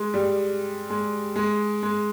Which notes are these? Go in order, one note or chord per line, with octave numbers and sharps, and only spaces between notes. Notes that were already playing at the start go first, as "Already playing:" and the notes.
Already playing: G#3
G3
G#3
G#3
G#3